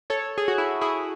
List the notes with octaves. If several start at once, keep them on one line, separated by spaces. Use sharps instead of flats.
A4 C#5
G#4
F#4
E4
E4 G#4